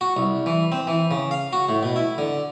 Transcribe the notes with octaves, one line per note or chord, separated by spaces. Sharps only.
F#4
C2
E3
C4
E3
C#3
F5
F#4
A2
B2
E4
D3